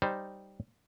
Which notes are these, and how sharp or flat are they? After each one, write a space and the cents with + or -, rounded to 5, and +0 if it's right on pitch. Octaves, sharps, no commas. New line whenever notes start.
G3 +0 D#4 +0 C5 +0